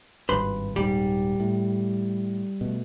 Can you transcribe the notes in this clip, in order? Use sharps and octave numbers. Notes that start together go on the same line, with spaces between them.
G#1 G2 B4 C6
D#1 G#2 G3
A2
B2 A3